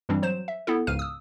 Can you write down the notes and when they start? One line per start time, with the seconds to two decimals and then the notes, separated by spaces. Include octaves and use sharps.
0.09 G2 E3 G3 C4 D4
0.22 F#3 C5 E7
0.48 E5
0.67 B3 E4 A4
0.87 C#2 G#2 C#3 F5 F6 D#7
0.99 D#6 E6